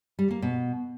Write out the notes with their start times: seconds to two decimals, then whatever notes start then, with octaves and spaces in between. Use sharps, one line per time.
0.19 G3
0.30 A#3
0.42 B2